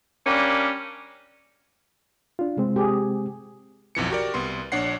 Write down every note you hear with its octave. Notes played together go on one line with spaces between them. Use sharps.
G3 A#3 C#4 D4
D4 F4
C3 G#3 C4
G4 G#4
B1 F2 E3 C#7
F#4 G4 A#4 D5
C2 B3 C6
A#1 D4 C#5 F#5 C7